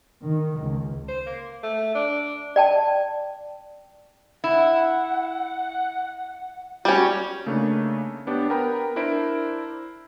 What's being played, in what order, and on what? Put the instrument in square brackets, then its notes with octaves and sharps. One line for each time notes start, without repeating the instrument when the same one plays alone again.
[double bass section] D#3
C#2
[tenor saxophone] C5
A#3
A3
D4
[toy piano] D5 G5 A5
[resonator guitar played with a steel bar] E4 [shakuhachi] F#5
[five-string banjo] G3 C#4 [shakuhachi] F#4
[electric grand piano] C#3 A3 A#3 D4 D#4 C#5
B3 D4 G4 C#5
B3 A#4 B4 G5 A#5 B5
D4 E4 A#4 C5 D7